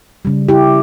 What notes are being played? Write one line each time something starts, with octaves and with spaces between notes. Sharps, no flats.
C#3 G3
E4 G4